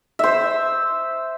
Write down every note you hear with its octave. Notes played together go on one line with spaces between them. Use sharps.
C5 E5